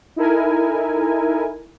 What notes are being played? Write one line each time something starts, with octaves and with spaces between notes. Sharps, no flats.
D#4 E4 A4 A#4 G#5